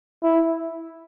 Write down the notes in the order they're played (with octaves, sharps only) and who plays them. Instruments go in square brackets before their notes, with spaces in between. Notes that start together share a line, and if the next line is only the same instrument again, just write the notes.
[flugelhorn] E4